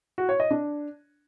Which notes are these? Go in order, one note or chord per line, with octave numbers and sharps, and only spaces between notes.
F#4
C#5
D#5
D4